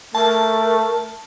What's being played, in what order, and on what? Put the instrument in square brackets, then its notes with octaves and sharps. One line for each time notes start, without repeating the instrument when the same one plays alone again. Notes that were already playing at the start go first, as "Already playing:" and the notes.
[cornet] A3 [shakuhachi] A#4 [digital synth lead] A5